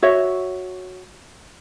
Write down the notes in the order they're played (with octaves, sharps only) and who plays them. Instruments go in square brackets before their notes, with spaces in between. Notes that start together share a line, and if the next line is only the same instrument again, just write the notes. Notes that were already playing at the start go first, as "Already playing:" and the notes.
[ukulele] F#4 C#5 E5